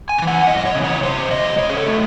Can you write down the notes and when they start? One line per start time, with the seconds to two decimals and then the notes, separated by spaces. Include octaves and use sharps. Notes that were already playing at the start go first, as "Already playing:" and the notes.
0.09 G#5
0.18 C#3
0.22 E3
0.27 F#5
0.47 F#2 D#5
0.58 D#5
0.65 C#5
0.75 C#3 E3
0.84 C#5
1.03 C#3 C5
1.31 F#3 A3 D#5
1.58 C#3 C#5
1.70 G#4
1.77 A4
1.86 F#3 A3